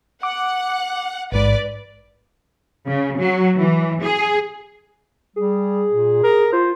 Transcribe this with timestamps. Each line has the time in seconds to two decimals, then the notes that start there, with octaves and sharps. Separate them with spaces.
0.23 F#5 D6
1.32 A1 G#2 B4 D5
2.87 C#3
3.19 F#3
3.59 E3
4.03 G#4
5.36 G3 G#4
5.90 A#2
6.24 A#4
6.53 F4 C5